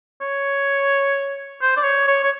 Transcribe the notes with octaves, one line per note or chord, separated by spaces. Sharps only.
C#5
C5
D5
C#5
C#5
C#5